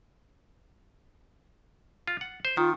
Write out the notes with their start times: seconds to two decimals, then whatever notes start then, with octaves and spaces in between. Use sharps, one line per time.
2.07 F4
2.21 F#5
2.45 C5
2.57 D#3 F4